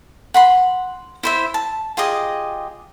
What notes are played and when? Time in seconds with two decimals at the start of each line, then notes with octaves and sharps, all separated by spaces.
0.34 F#5 B5 C6
1.23 E4 C5 E5
1.54 A5
1.97 F4 G4 G#4 D#5